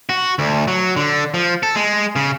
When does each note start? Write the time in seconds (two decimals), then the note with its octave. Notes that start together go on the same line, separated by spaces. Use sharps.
0.09 F#4
0.39 D2
0.68 F#3
0.96 D3
1.34 F3
1.63 A4
1.75 G#3
2.16 C#3